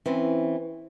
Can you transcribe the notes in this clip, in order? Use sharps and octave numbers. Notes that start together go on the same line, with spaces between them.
E3 C4 C#4